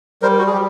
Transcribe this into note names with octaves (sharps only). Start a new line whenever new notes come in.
G3 A#4 C5
F#4
G#4
G3 G4